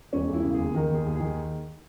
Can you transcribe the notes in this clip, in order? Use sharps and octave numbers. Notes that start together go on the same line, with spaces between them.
E1 C#4
E1
E4
C#3
G#4
D#2
D#3 A#4
D#2 G#4
D#2
D#3 G#4